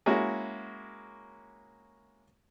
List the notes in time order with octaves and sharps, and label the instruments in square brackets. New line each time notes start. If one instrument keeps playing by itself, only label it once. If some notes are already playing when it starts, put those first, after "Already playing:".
[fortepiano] G#3 A#3 C#4 E4 F#4